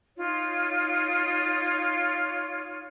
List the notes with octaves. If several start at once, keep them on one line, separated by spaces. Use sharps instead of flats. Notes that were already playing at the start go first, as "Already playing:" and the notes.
D#4 F4 C#5